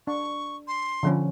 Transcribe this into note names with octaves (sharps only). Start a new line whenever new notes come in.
D4 C#6
C6
D3 F3 C#4